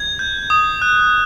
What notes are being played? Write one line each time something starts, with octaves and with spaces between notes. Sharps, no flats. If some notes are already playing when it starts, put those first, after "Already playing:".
Already playing: G#6
G6
D#6
F#6